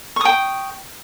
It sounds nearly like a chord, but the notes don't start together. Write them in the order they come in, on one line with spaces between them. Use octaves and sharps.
C#6 D#6 G5